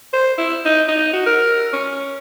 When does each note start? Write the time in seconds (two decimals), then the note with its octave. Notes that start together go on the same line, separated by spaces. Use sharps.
0.13 C5
0.38 E4
0.65 D#4
0.88 D#4
1.13 F#4
1.26 A#4
1.73 C#4